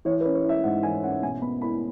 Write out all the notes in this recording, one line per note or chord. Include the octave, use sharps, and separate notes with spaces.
E3 C#5
B4
C#4
C#5
E4 E5
G#2 F#5
E3 G#5
C#4 F#5
B2 G#5
B3 B5
E4 B5